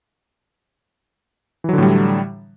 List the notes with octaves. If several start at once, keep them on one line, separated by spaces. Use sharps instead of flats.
A2 D3 E3 F#3 G3